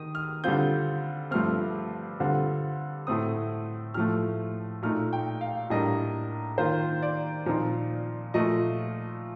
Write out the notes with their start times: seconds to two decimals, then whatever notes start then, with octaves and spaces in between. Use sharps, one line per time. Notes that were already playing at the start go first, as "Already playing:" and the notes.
Already playing: D#3 D#6
0.15 F6
0.44 D3 G3 C4 F4 G6
1.31 G2 F3 A3 C4 F6
2.20 D3 G3 C4 F4
3.07 A2 A3 C4 D#6
3.94 A2 F3 A3 F6
4.82 A#2 A3 D#4 F6
5.13 G5
5.41 F5
5.70 A2 G3 A#3 D4 D#5
6.58 D#3 A#3 F4 C5
7.03 D5
7.46 A#2 F3 C4 D#4
8.34 A#2 F3 A3 D#5